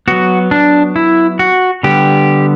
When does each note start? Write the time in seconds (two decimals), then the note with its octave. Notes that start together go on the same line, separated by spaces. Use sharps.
0.08 F#3 B3 F#4
0.51 D4
0.96 E4
1.39 F#4
1.83 D3 G3 B3 G4